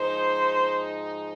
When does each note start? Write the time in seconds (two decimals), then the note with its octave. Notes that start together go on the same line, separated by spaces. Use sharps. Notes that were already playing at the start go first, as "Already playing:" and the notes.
Already playing: G#2 F3 G#3 D#4 C5